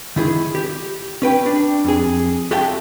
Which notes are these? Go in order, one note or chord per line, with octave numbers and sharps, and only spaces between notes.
D#3 E4 G#4
G4
C#4 B4 G5
D4
F2 G#4
F#4 G4 A4 E5 G5